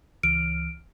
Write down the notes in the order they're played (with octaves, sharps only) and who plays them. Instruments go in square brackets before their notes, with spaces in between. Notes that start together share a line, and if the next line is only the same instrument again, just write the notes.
[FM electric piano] C#2 E3 F6 [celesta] D7